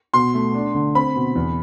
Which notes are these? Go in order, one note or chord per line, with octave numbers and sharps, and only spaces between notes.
B2 C6
A3
D4
D3
C4 B5
B2
E2